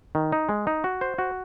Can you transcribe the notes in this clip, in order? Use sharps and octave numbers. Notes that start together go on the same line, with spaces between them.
D#3
D#4
G#3
D#4
F#4
C5
F#4